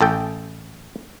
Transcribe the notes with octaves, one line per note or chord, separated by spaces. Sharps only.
A1 A4 G5